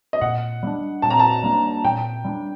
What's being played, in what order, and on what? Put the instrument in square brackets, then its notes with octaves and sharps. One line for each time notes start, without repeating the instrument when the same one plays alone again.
[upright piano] D#5
[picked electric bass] A#2 [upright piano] F#5
[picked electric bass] G3 A#3
D4
[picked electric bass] A#2 [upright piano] A5
[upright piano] A#5
A5
[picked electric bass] G3 A#3 D4
[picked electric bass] A#2 [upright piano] G5
[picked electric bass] G3 A#3 D4